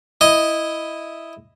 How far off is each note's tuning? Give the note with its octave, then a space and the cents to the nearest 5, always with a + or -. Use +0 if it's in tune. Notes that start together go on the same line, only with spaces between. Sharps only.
E4 +0 D#5 +0